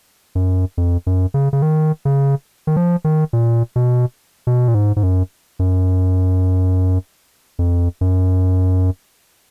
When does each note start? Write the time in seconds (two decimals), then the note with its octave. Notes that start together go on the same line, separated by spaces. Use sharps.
0.35 F#2
0.78 F2
1.07 F#2
1.34 C#3
1.53 C#3
1.62 D#3
2.05 C#3
2.67 D#3
2.76 F3
3.04 D#3
3.33 A#2
3.76 B2
4.47 B2
4.68 A#2
4.74 G#2
4.96 G#2
5.03 F#2
5.59 F#2
7.59 F2
8.01 F#2